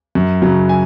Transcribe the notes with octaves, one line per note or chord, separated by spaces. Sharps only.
F#2
C#3 F#3
G#5